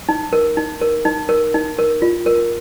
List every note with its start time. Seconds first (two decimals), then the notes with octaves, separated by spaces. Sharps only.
0.09 D#4
0.33 A#4
0.57 D#4
0.81 A#4
1.05 D#4
1.29 A#4
1.54 D#4
1.79 A#4
2.02 F4
2.26 A#4